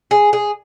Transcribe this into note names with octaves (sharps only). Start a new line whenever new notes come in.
G#4
G#4